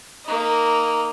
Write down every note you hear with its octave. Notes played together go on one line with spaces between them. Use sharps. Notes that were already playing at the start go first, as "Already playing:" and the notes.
A#3 D#4